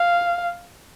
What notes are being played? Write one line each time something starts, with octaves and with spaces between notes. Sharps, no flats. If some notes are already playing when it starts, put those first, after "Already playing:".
Already playing: F5